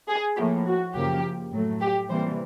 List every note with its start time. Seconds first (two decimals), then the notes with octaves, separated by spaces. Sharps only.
0.09 G#4
0.36 A2 F3 A#3 G4
0.66 F#4
0.94 F#2 C#3 F3 A#3 G4
1.52 A2 F#3 A3
1.81 G4
2.09 C3 E3 G3 A#3 C5